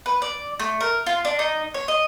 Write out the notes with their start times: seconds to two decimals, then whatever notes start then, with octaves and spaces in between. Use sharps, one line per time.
0.06 B4
0.22 D5
0.59 A3
0.81 A#4
1.06 F4
1.25 D4
1.39 D#4
1.74 C#5
1.88 D#5